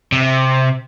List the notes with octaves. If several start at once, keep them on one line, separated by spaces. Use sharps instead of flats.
C3